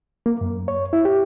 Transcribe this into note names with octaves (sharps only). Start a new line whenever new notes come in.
A#3
F#2
C#5
E4
G4